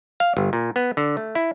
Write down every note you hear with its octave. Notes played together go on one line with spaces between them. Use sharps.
F5
G1
A#2
B3
D3
A3
E4